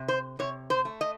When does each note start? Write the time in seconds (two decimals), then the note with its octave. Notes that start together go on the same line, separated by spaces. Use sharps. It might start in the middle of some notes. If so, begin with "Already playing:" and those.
Already playing: C3
0.08 C5
0.39 C3 C#5
0.70 C5
0.85 A3
1.01 D#5